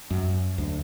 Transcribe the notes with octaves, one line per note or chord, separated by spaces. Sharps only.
F#2
D2